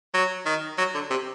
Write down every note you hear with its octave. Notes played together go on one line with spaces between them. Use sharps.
F#3
D#3
F#3
D3
C3